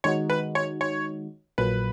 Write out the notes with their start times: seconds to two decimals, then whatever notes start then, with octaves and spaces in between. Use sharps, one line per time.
0.04 D#3 G#3 D#4 F#4 C#5
0.30 B4
0.55 C#5
0.81 C#5
1.58 A#1 A#2 F#3 A#3 B4